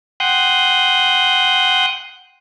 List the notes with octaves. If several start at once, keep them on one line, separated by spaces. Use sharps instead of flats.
F#5 G5 C6 D#6 F#6 G6